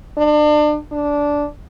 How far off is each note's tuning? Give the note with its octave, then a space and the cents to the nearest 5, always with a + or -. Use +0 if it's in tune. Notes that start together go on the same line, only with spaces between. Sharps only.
D4 +35
D4 -10